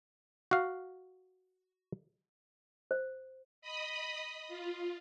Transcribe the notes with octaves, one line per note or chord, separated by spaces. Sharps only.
F#4 F5
C5
D#5 B5 D#6
F4